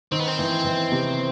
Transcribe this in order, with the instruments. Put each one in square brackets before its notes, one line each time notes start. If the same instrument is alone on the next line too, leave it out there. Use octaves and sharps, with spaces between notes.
[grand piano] D#3 [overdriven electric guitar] C4
[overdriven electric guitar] B3
C4
[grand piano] E3
E3
C3